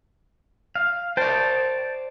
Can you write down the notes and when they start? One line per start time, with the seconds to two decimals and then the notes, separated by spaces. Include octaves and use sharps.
0.75 F5
1.17 C5 D5 G5 A5